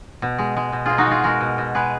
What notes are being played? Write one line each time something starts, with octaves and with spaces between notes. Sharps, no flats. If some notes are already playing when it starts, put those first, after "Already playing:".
B2
G#3
G#3
B2
B2 F4 G#4
D#4 F#4
G#3 F4 G#4
G#3 F#4 A#4
B2
B2
G#3 G#4 B4